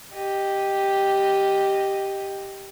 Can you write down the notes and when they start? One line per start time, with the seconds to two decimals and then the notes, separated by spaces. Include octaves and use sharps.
0.13 G4 D#5